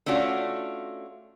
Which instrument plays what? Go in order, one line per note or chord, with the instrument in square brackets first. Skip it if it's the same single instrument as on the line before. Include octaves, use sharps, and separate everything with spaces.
[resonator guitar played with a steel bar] A3 C#4 D4 F4 F#4